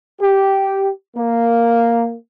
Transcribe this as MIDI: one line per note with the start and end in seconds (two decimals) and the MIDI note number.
0.21 0.89 67
1.16 2.14 58